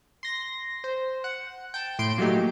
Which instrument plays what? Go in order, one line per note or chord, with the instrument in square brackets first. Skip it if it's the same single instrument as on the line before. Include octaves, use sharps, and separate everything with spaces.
[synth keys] C6 A#6
C5
F#5
G5 A5
A2 C6 D7
A#2 F#3 A3 D#4 G4